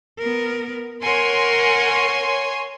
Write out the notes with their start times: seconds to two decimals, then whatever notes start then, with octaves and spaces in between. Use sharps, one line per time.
0.19 B3 A#4
1.02 A#4 C#5 F#5 G#5 C6